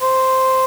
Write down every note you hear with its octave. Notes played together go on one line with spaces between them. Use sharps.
C5